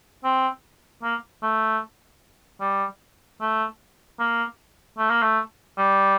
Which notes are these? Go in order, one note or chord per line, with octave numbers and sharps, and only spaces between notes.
C4
A#3
A3
G3
A3
A#3
A3
A#3
A3
G3